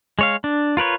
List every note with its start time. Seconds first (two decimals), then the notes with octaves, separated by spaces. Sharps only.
0.19 G#3 C#5 F5
0.44 D4
0.77 F4 A#4 B4 C#5